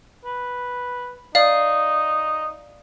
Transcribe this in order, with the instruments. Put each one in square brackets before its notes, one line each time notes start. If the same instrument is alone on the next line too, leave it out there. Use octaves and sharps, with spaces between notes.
[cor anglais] B4
[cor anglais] D#4 [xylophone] D5 F5